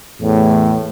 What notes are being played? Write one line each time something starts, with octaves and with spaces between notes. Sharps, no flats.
E2 A2